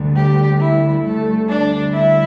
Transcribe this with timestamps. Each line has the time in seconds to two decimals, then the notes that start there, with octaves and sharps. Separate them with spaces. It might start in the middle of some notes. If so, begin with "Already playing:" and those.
Already playing: D2 D3 G3
0.16 G4
0.60 E4
1.04 D2 D3 G3 A3 A4
1.48 D4 D5
1.93 E4 E5